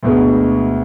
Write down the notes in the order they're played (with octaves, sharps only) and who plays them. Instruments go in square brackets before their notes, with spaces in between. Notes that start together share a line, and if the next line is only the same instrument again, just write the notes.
[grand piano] D2 B2 G#3